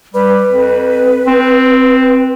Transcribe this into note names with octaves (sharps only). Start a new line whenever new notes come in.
G3 B4
F2
C4